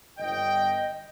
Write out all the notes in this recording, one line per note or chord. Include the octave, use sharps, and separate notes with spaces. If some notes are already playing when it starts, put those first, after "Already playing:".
G1 D#5 G5